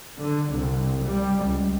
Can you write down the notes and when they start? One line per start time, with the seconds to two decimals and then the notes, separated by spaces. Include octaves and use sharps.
0.22 D3
0.53 C2
1.06 G3
1.45 C#2